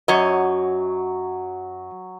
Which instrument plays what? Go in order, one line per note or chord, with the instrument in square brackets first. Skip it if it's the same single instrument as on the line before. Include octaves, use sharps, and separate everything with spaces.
[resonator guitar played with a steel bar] F#2 C#5 D#5 [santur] F#3